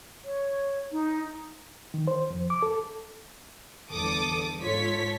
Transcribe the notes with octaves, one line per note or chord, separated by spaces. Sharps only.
C#5
D#4
D#3
C5
F2
D6
A4
G1 E2 A4 D6 D#6
G#2 F4 A4 C#5 B6